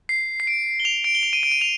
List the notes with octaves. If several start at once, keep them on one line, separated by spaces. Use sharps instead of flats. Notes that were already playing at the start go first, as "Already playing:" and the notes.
C7
C7
D7
G7
F7
D7
G7
F7
D#7
D7
D#7
F7